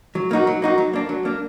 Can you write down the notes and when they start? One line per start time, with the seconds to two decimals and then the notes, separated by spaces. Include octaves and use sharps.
0.15 F#3
0.31 A#3 D#4 F#4
0.47 F#3
0.62 A#3 D#4 F#4
0.78 F#3
0.94 A#3 D4
1.09 F#3
1.25 A#3 D4